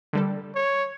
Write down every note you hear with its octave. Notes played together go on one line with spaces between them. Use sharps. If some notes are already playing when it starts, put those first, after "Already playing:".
D3 G3 A4
C#5